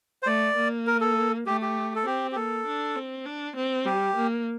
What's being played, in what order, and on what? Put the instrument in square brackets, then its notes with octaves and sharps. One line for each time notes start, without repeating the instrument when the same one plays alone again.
[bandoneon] C5
[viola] A3 [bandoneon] D5
[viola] A#3
[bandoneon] A#4
A4
[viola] A3 [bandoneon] G4
[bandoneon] G4
A4
[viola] C4 [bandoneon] G4
[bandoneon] G4
[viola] A#3 [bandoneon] A4
[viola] D4
C4
D4
C4
[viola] G3 [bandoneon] G4
[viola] A#3